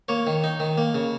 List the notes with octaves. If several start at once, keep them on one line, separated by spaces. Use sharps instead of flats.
A#3 C#5
D#3
D#4
D#3
A#3
C#3